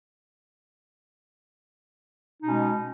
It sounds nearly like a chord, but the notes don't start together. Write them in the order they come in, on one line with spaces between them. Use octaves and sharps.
D#4 B2 C#4 G#3